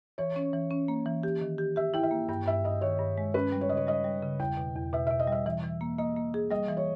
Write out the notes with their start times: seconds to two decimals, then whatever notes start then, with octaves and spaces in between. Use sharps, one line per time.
0.18 E3 C#5
0.36 C#4
0.54 E3
0.71 C#4
0.88 A#3
1.06 E3
1.23 G4
1.42 D#3
1.58 G4
1.76 G4 E5
1.94 E4 G5
2.03 E5
2.11 A#3
2.29 G2 G5
2.46 G2 E5
2.64 G2 D#5
2.81 D#3 C#5
2.99 G2
3.18 G#3
3.34 C#4 B4
3.52 G3
3.61 C#5
3.69 C#3 D#5
3.77 C#5
3.87 G3 D#5
4.05 G3
4.22 C#3
4.40 E2 G5
4.57 B2
4.76 E2
4.93 B2 E5
5.07 B2 E5
5.19 D#5
5.27 G3 E5
5.46 E3 E5
5.63 E3
5.81 A#3
5.98 A#3 D#5
6.17 A#3
6.34 G#4
6.51 G3 D#5
6.69 E3
6.77 C#5